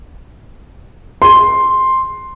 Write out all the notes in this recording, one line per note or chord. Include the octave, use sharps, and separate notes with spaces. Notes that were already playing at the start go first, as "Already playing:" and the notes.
C6